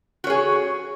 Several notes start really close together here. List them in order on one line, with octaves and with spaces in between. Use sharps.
F#4 C#5 G#4